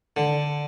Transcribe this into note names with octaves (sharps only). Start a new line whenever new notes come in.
D3